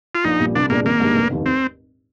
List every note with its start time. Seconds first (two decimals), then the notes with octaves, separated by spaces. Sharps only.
0.15 F4
0.24 A#1 D#4
0.40 A#2 G3
0.55 C2 D4
0.70 A#2 G#3 A#3 D4
0.85 G#1 A#3
1.00 G#2 G3 D4
1.15 F1
1.31 D#2 D#3
1.46 C4